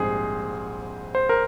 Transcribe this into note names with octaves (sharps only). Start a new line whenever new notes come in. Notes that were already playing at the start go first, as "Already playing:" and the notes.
Already playing: A#1 G#2 G3 C4 G#4 C5
C5
A#4